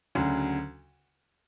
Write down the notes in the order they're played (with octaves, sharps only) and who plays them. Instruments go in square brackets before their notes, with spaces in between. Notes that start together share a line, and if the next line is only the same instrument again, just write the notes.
[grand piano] D2 C#3 F#3